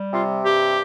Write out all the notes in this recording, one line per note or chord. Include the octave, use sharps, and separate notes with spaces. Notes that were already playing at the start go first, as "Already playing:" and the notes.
Already playing: G3
C3 F4
G2 G4